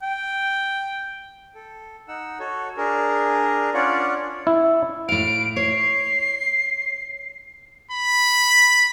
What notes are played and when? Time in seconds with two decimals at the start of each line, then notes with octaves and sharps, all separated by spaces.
0.03 G5
1.55 A4
2.08 D#4 F#5 E6
2.40 F#4 A4 C#5
2.77 D4 G#4 A#4
3.74 C#4 D4 F4 C#5 D5 F#5
4.47 E4
5.09 A2 F5 D7
5.56 C#5 C7
7.91 B5